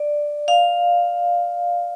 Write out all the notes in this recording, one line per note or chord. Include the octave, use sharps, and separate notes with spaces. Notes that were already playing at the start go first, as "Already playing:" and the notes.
Already playing: D5
F5